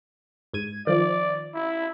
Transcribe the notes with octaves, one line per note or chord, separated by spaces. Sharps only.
G#2 G#6 D#7
D#3 F3 D5
E4